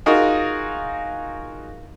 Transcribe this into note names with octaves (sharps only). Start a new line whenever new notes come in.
D#4 F4 F#4 G#4 A#4 D#5